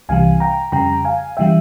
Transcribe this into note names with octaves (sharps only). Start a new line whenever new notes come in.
C2 C3 E3 G3 F5 G#5
G5 A#5
F2 C#3 G3 G5 A#5
F5 G#5
C#3 E3 G3 E5 G5